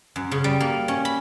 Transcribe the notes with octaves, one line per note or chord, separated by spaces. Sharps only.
F#2
C#3
G3
A#3
C#4
B5